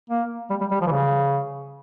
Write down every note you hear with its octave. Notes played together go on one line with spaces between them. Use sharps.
A#3
G3
G3
G3
F3
E3
C#3